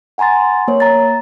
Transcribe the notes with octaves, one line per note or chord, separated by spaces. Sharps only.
F#5 G#5 A#5 C6 A6
A#3 C#5
A#5 A6